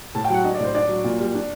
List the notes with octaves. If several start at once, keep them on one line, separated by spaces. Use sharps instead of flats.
A2 A5
G5
F#3 F#5
D4 D#5
D5
A2 C5
D4 D5
F#3
A#2
G3
D4